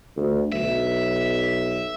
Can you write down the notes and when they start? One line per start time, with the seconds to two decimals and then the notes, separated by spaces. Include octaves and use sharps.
0.17 D2
0.52 B1 E5